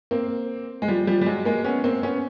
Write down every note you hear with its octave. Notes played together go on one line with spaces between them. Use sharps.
A#3 C4
G#3
F3 G3
F3 G3
G3
F#3 G#3
G#3 A#3
B3 C#4
A#3 C4
B3 C#4